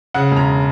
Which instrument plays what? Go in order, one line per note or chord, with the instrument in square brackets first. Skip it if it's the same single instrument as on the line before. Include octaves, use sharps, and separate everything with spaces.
[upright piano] C#3 F#5
E1
A#5